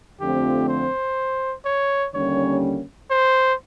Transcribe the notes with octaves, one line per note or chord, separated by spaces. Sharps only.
F2 D3 F3 A3 C4 G4
C5
C#5
D#2 D3 G3 A#3 C#4 C#5
C5